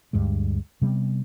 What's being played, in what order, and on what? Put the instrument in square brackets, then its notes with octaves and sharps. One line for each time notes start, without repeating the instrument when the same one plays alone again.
[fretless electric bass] D2 G2 G3 G#3
C3 G3 B3